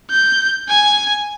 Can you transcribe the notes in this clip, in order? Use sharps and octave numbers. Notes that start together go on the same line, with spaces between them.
G6
G#5